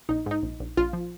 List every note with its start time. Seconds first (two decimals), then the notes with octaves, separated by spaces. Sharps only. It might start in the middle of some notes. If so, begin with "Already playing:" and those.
0.09 A#1 D#4
0.26 G#2 D#4
0.43 A#1
0.60 A#1
0.77 A#1 F4
0.93 F3